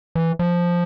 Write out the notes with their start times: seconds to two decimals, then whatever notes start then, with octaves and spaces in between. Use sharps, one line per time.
0.15 E3
0.39 F3